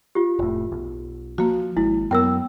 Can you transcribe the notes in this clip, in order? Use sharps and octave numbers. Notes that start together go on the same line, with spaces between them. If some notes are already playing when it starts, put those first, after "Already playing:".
F4 G4
F1 A2
B1
F3 A#3 F#4
G#1 G#3 E4
F#2 B3 A#4 G5 E6